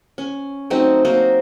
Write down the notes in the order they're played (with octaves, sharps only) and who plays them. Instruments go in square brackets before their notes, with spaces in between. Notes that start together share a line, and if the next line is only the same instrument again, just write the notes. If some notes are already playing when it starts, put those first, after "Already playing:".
[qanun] C#4
F#3 A3 C4 D#4
A#3 D#4 F#4 C5